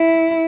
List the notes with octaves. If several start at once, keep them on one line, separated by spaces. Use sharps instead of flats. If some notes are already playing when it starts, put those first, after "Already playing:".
Already playing: E4